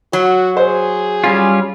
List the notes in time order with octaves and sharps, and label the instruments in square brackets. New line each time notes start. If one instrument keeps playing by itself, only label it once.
[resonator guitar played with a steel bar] F#3 [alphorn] F#4
[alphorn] G#4 [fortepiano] C5
[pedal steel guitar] G3 C#4 F4